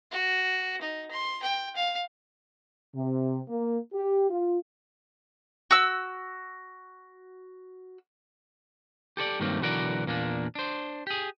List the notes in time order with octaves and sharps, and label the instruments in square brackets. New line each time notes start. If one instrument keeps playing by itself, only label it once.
[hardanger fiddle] F#4
D#4
C6
G5
F5
[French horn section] C3
A#3
G4
F4
[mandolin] F#4 E6
[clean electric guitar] G4 A4 C5 D5
G2 D#3 F#3 A3 A#3 C4
B1 D3 E3 F#4 A#4 D5
E2 A#2 A#3 D4
D4 C5
G4 G#4